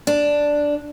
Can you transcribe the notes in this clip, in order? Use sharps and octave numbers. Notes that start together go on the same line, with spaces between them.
D4